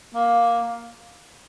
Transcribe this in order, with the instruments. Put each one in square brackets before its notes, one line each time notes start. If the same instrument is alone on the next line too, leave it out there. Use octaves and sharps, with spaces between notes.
[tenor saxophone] A#3